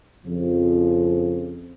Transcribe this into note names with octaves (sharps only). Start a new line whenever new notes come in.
F2 C#3 F3